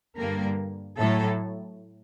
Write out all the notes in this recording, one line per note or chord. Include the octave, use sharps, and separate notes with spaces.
G2 D3 G3 A#3 A#4
A2 F#3 A3 A4